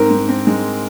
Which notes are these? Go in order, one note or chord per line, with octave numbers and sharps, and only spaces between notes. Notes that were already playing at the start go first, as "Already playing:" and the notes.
Already playing: G#2 C4 A#4
G#2
C4
G#3